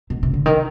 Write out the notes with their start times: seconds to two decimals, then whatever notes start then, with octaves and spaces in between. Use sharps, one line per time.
0.10 B2
0.23 C3
0.33 D3
0.46 D#3